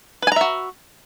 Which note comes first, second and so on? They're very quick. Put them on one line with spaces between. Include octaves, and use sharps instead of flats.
B4 G#5 A#5 E5 F#4